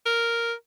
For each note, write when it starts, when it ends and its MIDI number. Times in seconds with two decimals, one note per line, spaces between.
0.06 0.53 70